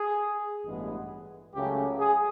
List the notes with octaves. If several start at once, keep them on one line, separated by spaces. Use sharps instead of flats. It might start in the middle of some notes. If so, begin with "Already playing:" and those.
Already playing: G#4
A1 G2 E3 G#3 B3
C#2 C#3 F#3 A3 G4
G#4